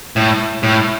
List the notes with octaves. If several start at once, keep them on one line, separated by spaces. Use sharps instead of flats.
A2
A2